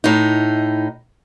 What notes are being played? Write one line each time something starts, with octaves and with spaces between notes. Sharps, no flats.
A2 D#4